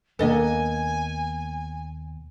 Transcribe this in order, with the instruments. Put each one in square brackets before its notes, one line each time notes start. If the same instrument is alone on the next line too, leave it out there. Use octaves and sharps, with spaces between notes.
[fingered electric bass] D#2 B2 [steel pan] A#3 D4 B4 [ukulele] A4 D#5 [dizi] G#5